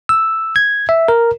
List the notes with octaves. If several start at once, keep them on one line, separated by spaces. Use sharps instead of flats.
E6
G#6
E5
A#4